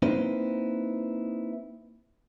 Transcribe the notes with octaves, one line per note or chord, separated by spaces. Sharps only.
A#3 C4 D#4 E4 B4 C5